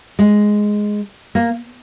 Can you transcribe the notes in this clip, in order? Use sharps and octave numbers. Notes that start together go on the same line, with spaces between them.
G#3
A#3